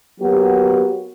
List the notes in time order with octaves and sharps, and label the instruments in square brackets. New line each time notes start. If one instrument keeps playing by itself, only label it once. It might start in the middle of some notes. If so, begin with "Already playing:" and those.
[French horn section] F#3 A#3 B3 F#4 G4